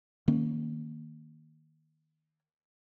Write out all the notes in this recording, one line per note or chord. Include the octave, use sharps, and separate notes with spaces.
D#3 A#3 C#4